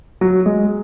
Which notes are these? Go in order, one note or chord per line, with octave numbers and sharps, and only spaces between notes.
F#3
G#3